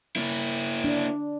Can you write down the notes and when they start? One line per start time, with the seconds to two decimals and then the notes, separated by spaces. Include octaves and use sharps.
0.16 A#3 E4
0.84 D4